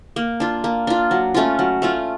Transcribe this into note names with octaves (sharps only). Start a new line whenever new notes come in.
A#3
D4 F4
A#3
D4 F4
F#3
A3 C#4 F4
F#3
A3 C#4 F4